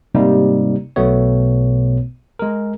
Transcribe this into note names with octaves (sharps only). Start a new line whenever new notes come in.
G#2 C3 G3 A#3 D#4
B1 B2 A3 B3 C#5
G#3 A#4